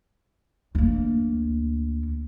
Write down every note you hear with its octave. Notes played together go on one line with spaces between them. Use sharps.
D2 A#3